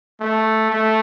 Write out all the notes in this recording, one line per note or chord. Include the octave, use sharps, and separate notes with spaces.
A3
A3